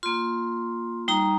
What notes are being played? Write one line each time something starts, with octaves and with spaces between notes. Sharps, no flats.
A#3 F4 C6
G3 D#4 A#5